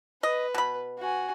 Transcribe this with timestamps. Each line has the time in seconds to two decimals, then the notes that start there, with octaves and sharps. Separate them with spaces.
0.23 B4 D#5
0.54 B2 B5
0.98 F#4 G#5